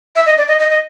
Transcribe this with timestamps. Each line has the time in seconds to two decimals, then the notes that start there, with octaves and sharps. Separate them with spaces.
0.16 E5
0.26 D#5
0.38 D5
0.48 D#5
0.59 D#5
0.70 D#5